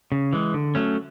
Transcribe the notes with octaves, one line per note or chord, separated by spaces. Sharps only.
C#3
E3 G#3
D3
F#3 A3 C#4